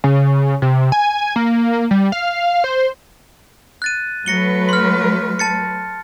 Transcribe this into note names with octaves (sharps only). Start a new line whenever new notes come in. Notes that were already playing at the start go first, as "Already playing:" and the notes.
C#3
C3
G#5
A#3
G3
F5
C5
F#6 A6 D#7
F#3 A3 B4 A#6 C#7 G7
C6 F6
A5 A6 C#7